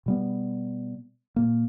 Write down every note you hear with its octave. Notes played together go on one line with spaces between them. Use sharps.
B2 G3 B3
A#2 A#3